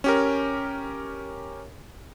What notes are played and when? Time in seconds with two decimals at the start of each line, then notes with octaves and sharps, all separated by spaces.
0.04 C#4 G4 A#4